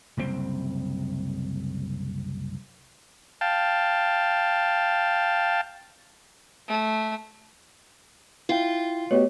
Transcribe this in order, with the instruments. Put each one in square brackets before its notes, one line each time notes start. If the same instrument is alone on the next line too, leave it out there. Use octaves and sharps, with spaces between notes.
[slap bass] F#1 C2 C3 C4
[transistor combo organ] F5 G5 A5
[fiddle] A3
[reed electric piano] E4 G5 [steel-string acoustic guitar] F4
[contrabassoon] B2 [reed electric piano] A3 G4 [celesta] C#5